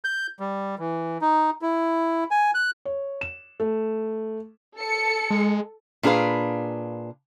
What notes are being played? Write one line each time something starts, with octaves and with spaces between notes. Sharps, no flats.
G6
G3
E3
D#4
E4
G#5
F#6
C#5
E7
A3
A4 C#7
G#3
A#2 D4 G#4 B4 F5